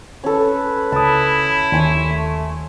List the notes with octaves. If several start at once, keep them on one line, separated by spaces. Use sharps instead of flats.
C#4 A4 B4
C#2 E4 A5 D#6
D#2 C#5 G#5 C6
A3